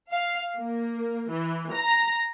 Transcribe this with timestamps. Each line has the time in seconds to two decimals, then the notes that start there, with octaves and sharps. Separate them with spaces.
0.12 F5
0.58 A#3
1.30 E3
1.73 A#5